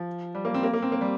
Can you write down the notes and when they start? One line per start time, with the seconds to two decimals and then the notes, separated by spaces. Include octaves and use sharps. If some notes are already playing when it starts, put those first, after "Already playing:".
Already playing: F3
0.35 G3
0.45 A#3
0.54 C4
0.63 A#3
0.74 A#3
0.82 C4
0.92 A#3
1.01 G3